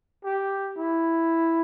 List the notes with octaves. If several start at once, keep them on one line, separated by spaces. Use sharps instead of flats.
G4
E4